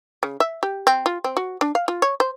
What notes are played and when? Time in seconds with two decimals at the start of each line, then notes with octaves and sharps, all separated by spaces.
0.23 C#3
0.40 E5
0.63 G4
0.87 C4
1.06 F4
1.24 C4
1.37 F#4
1.61 D4
1.75 F5
1.88 F4
2.02 C#5
2.20 C5